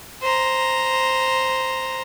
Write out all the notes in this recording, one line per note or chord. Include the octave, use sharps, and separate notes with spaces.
C5 A#5